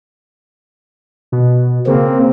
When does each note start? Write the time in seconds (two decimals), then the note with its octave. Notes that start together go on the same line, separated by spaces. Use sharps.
1.32 B2
1.87 C#3 A#3 C4